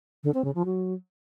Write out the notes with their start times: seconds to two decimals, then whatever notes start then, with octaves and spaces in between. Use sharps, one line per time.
0.24 D3
0.34 C4
0.44 C#3
0.55 F3
0.65 F#3